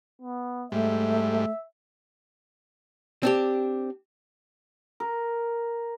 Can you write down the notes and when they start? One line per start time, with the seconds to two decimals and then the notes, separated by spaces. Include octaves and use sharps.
0.22 B3
0.72 G#2 G3 A3 E5
3.23 C4 D4 G4
5.00 A#4